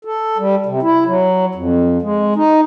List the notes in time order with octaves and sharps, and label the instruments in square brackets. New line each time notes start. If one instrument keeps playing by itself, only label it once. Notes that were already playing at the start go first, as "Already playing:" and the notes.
[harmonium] A4
G3
C3
E4
F#3
F2
G#3
D#4